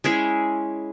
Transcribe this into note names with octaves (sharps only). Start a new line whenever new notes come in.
G#3 C#4 E4 G#4